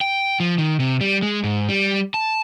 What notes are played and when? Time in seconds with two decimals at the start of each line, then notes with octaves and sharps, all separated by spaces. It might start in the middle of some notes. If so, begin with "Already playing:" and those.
0.01 G5
0.40 F3
0.58 D#3
0.80 C3
1.01 G3
1.22 G#3
1.44 G#2
1.69 G3
2.14 A5